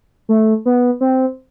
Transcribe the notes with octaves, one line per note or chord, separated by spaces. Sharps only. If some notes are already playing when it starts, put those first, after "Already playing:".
A3
B3
C4